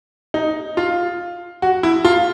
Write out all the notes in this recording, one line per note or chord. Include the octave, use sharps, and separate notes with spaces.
D#4
F4
F#4
E4
F4